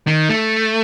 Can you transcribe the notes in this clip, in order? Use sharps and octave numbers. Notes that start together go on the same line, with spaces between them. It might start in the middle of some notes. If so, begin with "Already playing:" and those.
D#3
A3